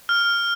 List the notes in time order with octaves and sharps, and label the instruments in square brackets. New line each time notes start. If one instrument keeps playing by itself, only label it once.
[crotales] F6